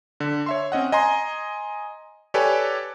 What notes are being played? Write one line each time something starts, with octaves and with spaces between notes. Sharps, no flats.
D3
C#5 E5 C6
C4 C#4 D#5 F#5
D#5 G#5 A#5 C6
G4 A4 B4 C#5 D5 G#5